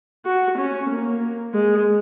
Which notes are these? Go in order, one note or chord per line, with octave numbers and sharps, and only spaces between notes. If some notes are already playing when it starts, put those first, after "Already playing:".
F#4
C#4
A#3
G#3